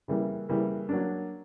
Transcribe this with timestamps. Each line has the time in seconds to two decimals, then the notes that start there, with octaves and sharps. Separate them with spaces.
0.08 C#3 E3 G3 A#3
0.49 C#3 E3 G3 A#3
0.89 F#3 A#3 D4